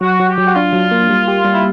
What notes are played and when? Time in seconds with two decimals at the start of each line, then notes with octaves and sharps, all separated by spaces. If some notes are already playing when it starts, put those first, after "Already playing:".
0.01 F#3 F#4
0.20 F#3
0.28 G4
0.38 F#3
0.46 F#4
0.55 D4 F4
0.73 F#3
0.91 A#3
1.09 G3
1.28 G4
1.45 G3
1.54 E4